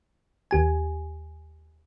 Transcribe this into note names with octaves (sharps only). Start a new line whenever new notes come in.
D#2 G4 G#5